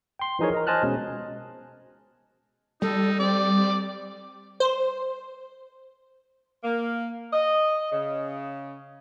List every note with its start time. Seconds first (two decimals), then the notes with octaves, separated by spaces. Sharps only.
0.19 G5 C6
0.39 E3 F3 D#4 G#4 A#4 C#5
0.52 A#4 D#5 A#5
0.67 C5 D#5 G#5 A5 F6 F#6
0.83 B2 G#3 C#4
2.82 G3 D#4 A4
3.19 C4 D5
4.60 C5
6.64 A#3
7.33 D#5
7.92 C#3